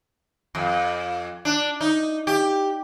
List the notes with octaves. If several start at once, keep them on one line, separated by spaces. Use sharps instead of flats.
F2
D4
D#4
G4